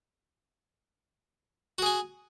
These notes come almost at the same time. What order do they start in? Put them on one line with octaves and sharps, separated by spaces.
F#4 G#4 G#5